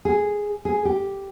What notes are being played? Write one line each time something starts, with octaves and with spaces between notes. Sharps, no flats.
G#4
G#4
G4